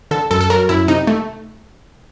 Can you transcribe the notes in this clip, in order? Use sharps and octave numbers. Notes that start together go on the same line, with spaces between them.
D3 A4
F#2 A4
A4
F#3 A#4
F#2 E4
C3 D#4
A3